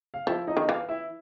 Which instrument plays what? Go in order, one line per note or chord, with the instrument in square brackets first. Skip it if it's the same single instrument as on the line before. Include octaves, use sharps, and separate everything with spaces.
[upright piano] F5
[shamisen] F3 [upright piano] E4 E5
[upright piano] D#4 D#5
[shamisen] D#3
[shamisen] E3 [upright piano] F4 F5
[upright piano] E4 E5